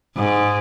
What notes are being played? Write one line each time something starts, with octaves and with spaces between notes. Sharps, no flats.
G#2